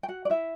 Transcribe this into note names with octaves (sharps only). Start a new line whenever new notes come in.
G5
F#4 F#5
D5
E4 E5